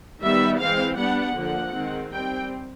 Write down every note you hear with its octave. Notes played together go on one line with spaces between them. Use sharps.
D#3 G3 B3 E5
E3 G#3 C4 F5
G3 B3 D4 F#5
D3 F3 A#3 F#5
D#3 G#3 C4
G3 C4 G5